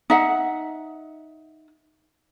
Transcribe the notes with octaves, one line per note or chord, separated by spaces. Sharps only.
D#4 E5 F#5